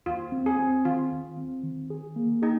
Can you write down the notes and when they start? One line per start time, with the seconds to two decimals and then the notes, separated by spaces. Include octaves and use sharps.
0.06 D#2 F4
0.32 C4
0.46 G#4
0.59 C4
0.85 D#3 F4
1.12 D#2
1.38 C4
1.64 D#3
1.90 G#4
2.16 A#3
2.42 D#4 G#4